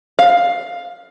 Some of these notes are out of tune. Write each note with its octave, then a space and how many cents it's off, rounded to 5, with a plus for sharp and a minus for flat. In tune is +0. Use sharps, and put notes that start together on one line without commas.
F5 +10